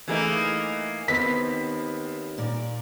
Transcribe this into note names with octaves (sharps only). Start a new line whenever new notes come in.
E3 A3 A#3 D#4 E4 G#4
D#2 B3 C4 B4 B6
A#2 A#4 D5